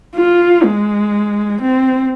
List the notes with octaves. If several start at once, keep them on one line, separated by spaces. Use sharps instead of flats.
F4
G#3
C4